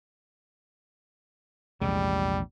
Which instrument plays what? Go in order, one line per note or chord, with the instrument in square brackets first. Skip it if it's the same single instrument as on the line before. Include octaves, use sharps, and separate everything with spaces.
[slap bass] A#1 C3 [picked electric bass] E2 G#3 [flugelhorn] G3